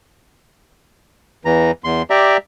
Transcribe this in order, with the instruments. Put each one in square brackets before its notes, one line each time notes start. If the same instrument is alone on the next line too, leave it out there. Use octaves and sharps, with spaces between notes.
[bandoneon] E2 E3 A#5
E2 C6
G4 D5 E5 A#5